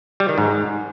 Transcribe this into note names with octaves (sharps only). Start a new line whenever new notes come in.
G3
D#3
G#2